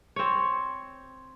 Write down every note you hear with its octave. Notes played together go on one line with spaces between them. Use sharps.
C4 C#5